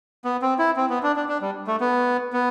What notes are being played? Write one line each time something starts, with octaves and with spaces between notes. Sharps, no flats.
B3
C4
E4
C4
B3
D4
D4
D4
G3
A3
B3
B3